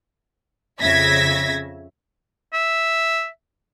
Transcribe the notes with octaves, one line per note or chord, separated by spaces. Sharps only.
F2 C#3 E5 G#6 A#6 B6
E5